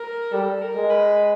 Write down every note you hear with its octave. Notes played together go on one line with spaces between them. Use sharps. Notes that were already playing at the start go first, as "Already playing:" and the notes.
Already playing: A#4
G3 A4
A#4
G#3
B4